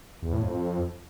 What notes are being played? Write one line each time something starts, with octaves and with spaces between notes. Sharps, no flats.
E2
A2
F2